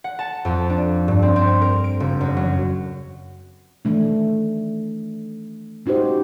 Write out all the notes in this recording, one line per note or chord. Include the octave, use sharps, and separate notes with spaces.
F#5
A5
F2
D4
G2
C4
C4
A#4
D7
F#1
F#2
F#3
D#3 E3 A3 D4
C#4 D#4 F#4 G4 C5